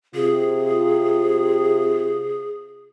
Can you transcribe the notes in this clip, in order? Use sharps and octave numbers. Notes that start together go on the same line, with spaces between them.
C3 F4 G#4